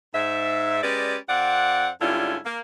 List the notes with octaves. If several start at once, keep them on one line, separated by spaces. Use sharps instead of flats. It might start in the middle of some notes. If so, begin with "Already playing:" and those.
G#2 E5
G#3 C#4 G4 B4 D5
F2 C4 D5 F5 F#5
G#2 D3 G3 C#4 E4 F4
A#3